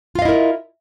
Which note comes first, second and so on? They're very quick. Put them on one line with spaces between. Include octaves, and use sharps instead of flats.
F4 F5 D#5 E4 A#4